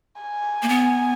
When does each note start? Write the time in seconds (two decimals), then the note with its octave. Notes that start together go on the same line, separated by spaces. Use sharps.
0.22 G#5
0.63 A#3
0.69 B3